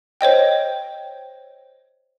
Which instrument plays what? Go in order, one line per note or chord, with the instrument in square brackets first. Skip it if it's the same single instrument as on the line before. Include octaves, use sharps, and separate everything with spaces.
[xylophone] C5 C#5 D#5 G5